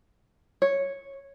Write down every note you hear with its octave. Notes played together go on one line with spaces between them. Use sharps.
C#5